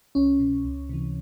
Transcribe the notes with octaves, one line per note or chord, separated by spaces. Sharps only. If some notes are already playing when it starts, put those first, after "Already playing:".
C2 C#4
B2
C#2
C3 E3